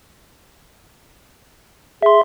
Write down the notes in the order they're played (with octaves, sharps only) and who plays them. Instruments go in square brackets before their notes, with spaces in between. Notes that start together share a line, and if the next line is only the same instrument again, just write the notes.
[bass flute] G#4 [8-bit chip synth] E5 C6